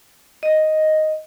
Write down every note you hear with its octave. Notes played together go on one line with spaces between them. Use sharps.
D#5